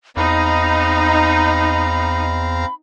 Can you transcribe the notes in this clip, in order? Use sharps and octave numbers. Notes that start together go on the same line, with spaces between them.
E2 C4 D#4 F5 A#5 B5